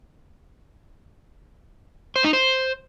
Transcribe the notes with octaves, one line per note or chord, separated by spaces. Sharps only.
C5
D#4
C5